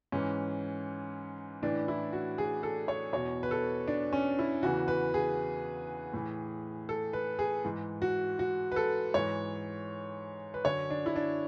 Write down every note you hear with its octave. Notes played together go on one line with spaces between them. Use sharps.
G#2 E3 C#4
A2 E3 D4
E4
F#4
G#4
A4
C#5
E2 B2 C#5
B4
A4
D4
C#4
E4
E2 C#3 E3 F#4
B4
G#4
A2 E3
A4
B4
G#4
G#2 E3
F#4
F#4
B4
A4
G#2 E3 C#5
B4
F#2 D3 C#5
D4
E4
D4